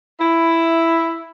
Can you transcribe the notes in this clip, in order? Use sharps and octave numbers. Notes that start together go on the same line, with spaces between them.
E4